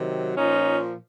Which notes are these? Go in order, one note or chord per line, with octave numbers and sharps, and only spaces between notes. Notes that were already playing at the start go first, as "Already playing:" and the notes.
Already playing: C3 D#3 F#3
A#2 F3 C#4 D#4